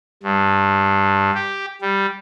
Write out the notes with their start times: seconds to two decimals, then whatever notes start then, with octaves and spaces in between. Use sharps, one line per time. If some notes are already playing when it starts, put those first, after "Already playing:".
0.23 G2
1.35 G4
1.81 G3